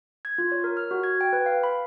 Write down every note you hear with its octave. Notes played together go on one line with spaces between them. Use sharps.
G#6
F4
C#5
A#4
F6
F#4
G#6
G5
B4
F5
B5